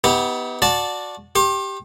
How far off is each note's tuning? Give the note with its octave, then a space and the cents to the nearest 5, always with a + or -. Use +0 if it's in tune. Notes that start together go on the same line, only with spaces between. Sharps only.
B3 +0 D#4 +45 G4 +0
F#4 -25 D5 +0 A5 -5
G4 +0 C6 +45